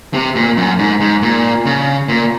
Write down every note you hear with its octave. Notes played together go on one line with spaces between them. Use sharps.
C3
A#2
F#2
G#2
G#2
A#2
C#3
A#2